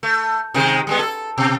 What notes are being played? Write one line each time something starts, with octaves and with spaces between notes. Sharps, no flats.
A3
C3 D#3 G#3
G3 G#3 B3
A4
B2